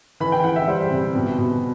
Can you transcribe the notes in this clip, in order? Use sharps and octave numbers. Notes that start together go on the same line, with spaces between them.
E3 B5
G5
E3 F#5
E5
G3 C5
C3
B2
B2